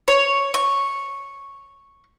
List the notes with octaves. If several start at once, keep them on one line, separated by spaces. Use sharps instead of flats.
C#5
C#6